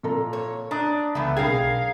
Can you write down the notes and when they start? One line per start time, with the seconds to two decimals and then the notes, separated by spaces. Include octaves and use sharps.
0.03 A#2 A4 A#5
0.33 C#5
0.71 D4 A#5 D#6 F#6
1.15 C#2 E3 A3 B3
1.37 B1 D4 G#4 A#4 F5 G5 G#6